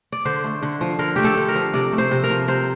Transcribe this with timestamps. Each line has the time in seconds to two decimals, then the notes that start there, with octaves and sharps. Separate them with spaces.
0.12 D5
0.25 D3 C5
0.44 A3
0.63 D3
0.81 F3
0.99 D3 A#4
1.16 A3 G4
1.25 A4
1.37 D3
1.48 A#4
1.55 F3
1.74 C3 D5
1.93 A3
1.98 C5
2.11 C3
2.24 A#4
2.30 F3
2.48 C3 C5